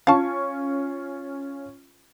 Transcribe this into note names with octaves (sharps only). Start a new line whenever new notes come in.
C#4 F4 F5 A5 C#6